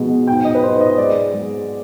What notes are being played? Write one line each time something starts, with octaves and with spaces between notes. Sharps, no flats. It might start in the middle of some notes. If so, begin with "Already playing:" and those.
Already playing: B2 F3 G#3
G#2 G5
D#5
B4
G#2 C5
D#5
G#3 D5
G#3